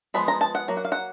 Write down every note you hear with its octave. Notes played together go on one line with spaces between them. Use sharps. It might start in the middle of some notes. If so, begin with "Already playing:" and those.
F3 G#3 B3 B5
A#5
A5
F#5
F#3 A#3
F#5
F5
F#5